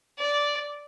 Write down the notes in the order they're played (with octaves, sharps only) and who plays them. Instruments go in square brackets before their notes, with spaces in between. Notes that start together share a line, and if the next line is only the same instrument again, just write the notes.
[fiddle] D5